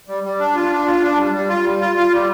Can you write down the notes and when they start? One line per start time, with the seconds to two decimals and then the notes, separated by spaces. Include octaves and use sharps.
0.08 G3
0.24 G3
0.39 D4
0.55 F4
0.70 D4
0.86 F4
1.02 D4
1.17 G3
1.33 G3
1.49 F4
1.64 G3
1.80 F4
1.96 F4
2.11 G3